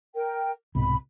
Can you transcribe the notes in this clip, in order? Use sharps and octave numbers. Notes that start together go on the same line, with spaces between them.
A#4 G5
C2 G#2 B2 B5